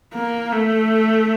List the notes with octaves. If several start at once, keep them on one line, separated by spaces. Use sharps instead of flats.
A#3
A3